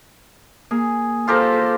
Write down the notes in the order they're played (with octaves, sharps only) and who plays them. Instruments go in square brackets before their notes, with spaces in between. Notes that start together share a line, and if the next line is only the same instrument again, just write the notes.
[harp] A#3 [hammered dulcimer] G#4
[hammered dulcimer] F4 G4 A#4 [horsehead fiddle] A4 C5